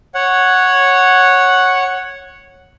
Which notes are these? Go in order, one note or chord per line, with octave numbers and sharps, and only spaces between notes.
C#5 F#5